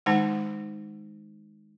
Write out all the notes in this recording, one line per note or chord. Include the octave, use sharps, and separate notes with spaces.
D#3 G#3 D#4 F#5 A5